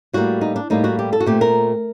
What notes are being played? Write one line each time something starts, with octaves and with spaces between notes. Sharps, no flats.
A2 G3 A#3 F#4
D#4
D4
A2 G3 A#3 D#4
F#4
G4
A4
F#4
A#2 A3 C4 G4
A#4